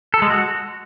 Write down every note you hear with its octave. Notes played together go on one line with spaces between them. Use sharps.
A4
G#3
F#4